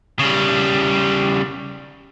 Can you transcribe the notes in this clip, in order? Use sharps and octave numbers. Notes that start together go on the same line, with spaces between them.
C#3 G3